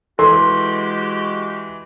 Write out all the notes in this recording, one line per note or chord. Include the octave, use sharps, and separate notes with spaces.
E3 G#3 F#4 G4 A4 C6